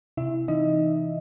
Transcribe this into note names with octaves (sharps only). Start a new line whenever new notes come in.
C3 E4 E5
E3 D#4 D#5